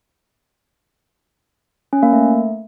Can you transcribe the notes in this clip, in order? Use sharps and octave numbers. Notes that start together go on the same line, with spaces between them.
C#4
A#3
A3